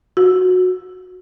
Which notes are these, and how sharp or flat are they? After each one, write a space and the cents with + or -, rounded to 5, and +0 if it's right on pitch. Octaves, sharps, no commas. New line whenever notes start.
F#4 -15